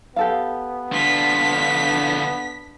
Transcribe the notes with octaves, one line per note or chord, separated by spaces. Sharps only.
B3 G4 A4 F5
D3 D4 F4 B6